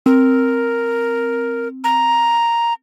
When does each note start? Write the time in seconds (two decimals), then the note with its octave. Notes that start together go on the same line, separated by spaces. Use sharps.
0.06 C4 A#4
1.84 A#5